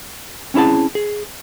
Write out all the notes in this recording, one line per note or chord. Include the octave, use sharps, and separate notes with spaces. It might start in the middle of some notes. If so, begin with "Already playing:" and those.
C4 C#4 E4 G#4 A5
G#4